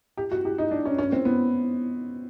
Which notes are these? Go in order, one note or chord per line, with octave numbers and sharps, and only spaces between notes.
G4
F#4
G4
D#4
D4
C#4
C#4
C4
B3